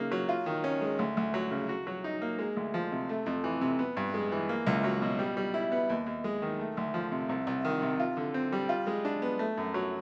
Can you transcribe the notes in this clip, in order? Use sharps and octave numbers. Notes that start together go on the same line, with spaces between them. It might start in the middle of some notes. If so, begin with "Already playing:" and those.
Already playing: C#3 A#3 D#4
F#3
F4
D#3
C#4
G#3
D2
D2
F#3
C#3
F#4
F#3
D#4
A#3
G#3
D2
F3
C3
A3
F2
E3
C3
B3
G2
G#3
E3
A#3
C#2
F#3
B2
G3
G3
E4
B3
D#2
D#2
G#3
D#3
A3
D2
F3
C3
C2
C2
D#3
C3
F4
D3
C4
G3
F4
G#3
D4
B3
A3
F#2
F#3